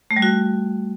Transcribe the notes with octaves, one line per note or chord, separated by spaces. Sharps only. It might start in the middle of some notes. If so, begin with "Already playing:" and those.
A3
G3
F#4